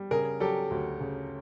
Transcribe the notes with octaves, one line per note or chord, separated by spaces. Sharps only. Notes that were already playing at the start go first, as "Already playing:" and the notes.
Already playing: G3
C#3 G#4 A#4
F#3 G4 A4
D2
C#3